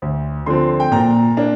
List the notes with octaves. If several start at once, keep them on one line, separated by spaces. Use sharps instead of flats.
D2
D3 F3 C4 C6
G5
A#2 A#5
A#3 D4